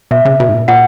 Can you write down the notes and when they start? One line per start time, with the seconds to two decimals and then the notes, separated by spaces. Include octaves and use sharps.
0.11 B2 E5
0.25 C#3
0.40 B2
0.49 G#2
0.54 A#2
0.68 A#2 F#5